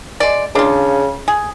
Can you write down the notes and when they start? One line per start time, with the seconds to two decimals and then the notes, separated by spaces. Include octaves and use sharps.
0.20 G#3 D5
0.55 C#3 D4 F4
1.28 G#4